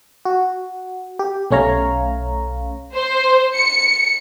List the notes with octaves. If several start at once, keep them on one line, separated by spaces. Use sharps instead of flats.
F#4
G4
B1 A3 C#4 C#5 F5 A#5
C5
C#7